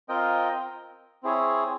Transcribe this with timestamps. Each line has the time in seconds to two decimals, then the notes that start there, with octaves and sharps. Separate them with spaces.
0.09 C4 F4 A#4 D#5 G5
1.23 C4 E4 G#4 C#5